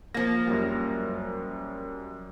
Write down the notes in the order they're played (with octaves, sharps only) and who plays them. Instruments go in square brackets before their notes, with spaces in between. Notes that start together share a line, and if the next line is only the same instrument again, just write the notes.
[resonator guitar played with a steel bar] F3 A#3 [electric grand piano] A#6
[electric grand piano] F#2 G3